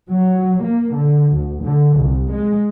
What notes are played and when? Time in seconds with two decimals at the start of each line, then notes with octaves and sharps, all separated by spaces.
0.10 F#3
0.63 A#3
0.93 D3
1.33 D2
1.62 D3
1.97 C2
2.29 G#3